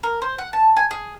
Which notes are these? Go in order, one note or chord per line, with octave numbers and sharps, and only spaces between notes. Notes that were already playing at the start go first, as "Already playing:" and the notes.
A#4
C5
F#5
A5
G#5
G#4